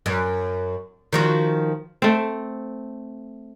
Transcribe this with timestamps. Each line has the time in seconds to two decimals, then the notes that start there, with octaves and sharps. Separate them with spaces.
0.06 F#2
1.13 D#3 F3 F#4
2.02 A3 C4